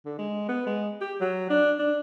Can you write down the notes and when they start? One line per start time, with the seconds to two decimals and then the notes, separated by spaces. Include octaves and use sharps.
0.05 D3
0.18 G#3
0.49 B3
0.66 G#3
1.01 G4
1.20 F#3
1.50 D4
1.79 D4